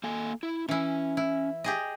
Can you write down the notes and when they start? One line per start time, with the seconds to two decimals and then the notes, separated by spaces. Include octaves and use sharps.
0.04 A#3 A4 G#5
0.43 E4
0.68 E3 C#4 E4
1.17 E4
1.64 G4 G#4 D#5